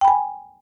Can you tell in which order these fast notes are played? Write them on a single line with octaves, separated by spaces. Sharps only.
G5 B5 G#5